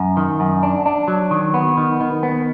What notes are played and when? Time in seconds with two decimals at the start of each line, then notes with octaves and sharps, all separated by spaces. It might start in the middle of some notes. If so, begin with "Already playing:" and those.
Already playing: F#2
0.17 D#3
0.40 F#2
0.63 D4
0.86 D4
1.08 F#3
1.31 D#3
1.54 B3
1.77 D#3
2.00 D#3
2.23 B3